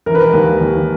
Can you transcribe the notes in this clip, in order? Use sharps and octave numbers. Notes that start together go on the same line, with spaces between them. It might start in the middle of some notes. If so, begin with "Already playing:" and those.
E3 A#4
B4
A#4
D#2
D#2